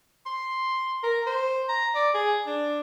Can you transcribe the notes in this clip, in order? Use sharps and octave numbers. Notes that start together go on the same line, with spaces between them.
C6
A#4
C5
A#5
D5
G#4
D4